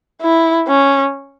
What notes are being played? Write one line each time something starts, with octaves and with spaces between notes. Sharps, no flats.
E4
C#4